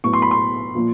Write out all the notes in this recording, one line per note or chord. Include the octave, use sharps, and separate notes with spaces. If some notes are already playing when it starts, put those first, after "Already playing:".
A2 F#3 B3 C#6
C6
B5
C6
A#2 F3 A#3